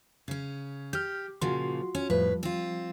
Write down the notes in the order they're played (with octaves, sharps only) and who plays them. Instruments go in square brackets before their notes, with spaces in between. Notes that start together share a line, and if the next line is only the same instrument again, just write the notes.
[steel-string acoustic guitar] C#3 C#4
[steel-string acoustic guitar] G4 [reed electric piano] F6 G6
[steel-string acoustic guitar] A#2 C#3 F3 [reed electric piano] F4 F#4 C6
[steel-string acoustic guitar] C#4
[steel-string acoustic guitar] F2 A2 B4 [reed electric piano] F3 G3
[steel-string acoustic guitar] C4 F4